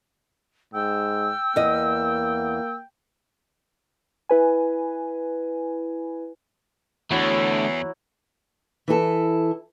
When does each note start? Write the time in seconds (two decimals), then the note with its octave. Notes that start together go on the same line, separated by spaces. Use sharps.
0.74 G#2 G5 E6
1.56 E2 A#3 D#5
4.29 E4 B4 G#5
7.11 E2 D3 F#3 A3 E4
8.88 E3 E4 A4